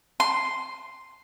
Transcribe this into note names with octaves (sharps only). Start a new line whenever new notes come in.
C6